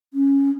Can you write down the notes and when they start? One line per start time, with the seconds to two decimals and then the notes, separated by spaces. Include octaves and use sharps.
0.14 C#4